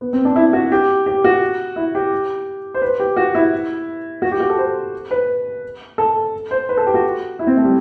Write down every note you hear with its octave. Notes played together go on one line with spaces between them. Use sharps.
B3
C4
D4
E4
F#4
G4
G4
F#4
E4
G4
C5
B4
G4
F#4
E4
F#4
G4
F#4
A4
C5
B4
A4
C5
B4
A4
G4
F#4
E4
C4
A3
G3